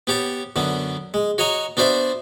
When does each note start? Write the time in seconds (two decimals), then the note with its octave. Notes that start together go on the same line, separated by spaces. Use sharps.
0.07 B3 G4 C#5 A5
0.56 F#2 D3 B3
1.14 G#3
1.38 F#4 C#5 D#5 A#5 C#6
1.77 B3 D4 F#4 C5 D5 E5